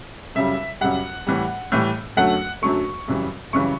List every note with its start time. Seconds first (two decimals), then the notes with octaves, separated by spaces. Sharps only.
0.35 F#2 C#3 G3 E5
0.81 F#2 C#3 G3 F#5
1.27 A2 E3 G3
1.72 A2 E3 G3
2.17 F#2 D3 F#3 A3 F#5
2.62 F#2 D3 F#3 A3 C#6
3.08 F#2 C#3 E3 G3
3.53 F#2 C#3 E3 G3 C#6